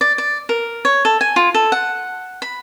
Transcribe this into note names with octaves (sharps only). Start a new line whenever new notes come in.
D5
D5
A#4
C#5
A4
G#5
F4
A4
F#5
B5